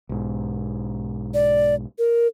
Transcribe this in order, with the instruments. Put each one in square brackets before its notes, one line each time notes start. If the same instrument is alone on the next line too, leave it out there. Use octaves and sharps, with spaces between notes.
[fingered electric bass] B1 G#2
[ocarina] D5
A#4